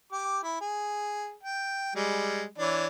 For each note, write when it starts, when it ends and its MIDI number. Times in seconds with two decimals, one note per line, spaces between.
0.12 0.38 67
0.12 0.38 86
0.43 0.57 64
0.61 1.34 68
1.43 1.95 79
1.95 2.45 55
1.95 2.45 56
2.58 2.87 52
2.58 2.87 62
2.58 2.87 73